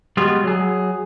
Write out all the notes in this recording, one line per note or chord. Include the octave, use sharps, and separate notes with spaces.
G3 G#3 B3 F4 F#4 G#4
F#3 G#4